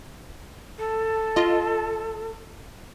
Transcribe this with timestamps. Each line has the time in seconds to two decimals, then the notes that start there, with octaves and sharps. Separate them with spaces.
0.78 A4
1.36 F4 D#5